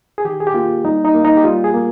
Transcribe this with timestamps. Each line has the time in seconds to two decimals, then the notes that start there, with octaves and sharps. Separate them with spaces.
0.18 G#4
0.25 D#3 G4
0.40 G#4
0.47 G4
0.54 A#3 F4
0.85 G3 D#4
1.05 D#4
1.14 A#3
1.25 D#4
1.37 G4
1.44 G3 F4
1.64 G#4
1.74 A#3